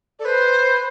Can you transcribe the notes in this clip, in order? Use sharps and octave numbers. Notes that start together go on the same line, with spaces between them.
A4 D5
B4 C5
B4